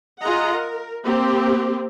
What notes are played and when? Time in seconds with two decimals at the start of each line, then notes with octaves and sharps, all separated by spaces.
0.20 F4 G#4 D#5 F#5 A#5
0.53 A#4
1.03 A#3 C4 G4